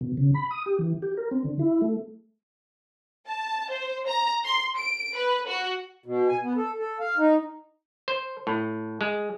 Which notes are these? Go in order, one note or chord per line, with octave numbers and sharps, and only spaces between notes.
B2
C#3
B5
D#6
G4
E3
G4
A#4
C4
D3
E4
A3
A5
C5
A#5
C6
D7
B4
F#4
B2
G#5
B3
A4
A4
F5
D#4
C5
A2
G#3